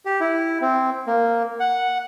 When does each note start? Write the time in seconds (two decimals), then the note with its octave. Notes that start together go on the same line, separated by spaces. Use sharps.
0.05 G4
0.20 E4
0.61 C4
1.07 A#3
1.60 F#5